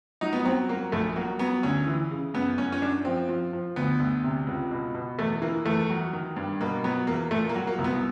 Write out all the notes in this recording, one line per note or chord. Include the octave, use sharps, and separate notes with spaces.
F#3 D#4
B3
F#3 C4
F#3 A#3
A#1 A3
F#3 A#3
F#3 B3
D2 C#4
E3
C#3
F#2 B3
F#2 C#4
C#4
F#2 D4
F3 C4
F3
F3
D2 B3
D2
C3
C#2
B2
B2
E2 A3
E3 A#3
E2 A3
F#3
D#3
G2
B2 A#3
F#3 B3
E2 A#3
A#2 A3
A#3
F#3
A#3
C2
B3